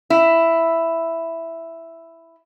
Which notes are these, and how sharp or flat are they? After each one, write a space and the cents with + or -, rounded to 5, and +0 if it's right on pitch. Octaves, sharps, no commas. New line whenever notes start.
E4 +5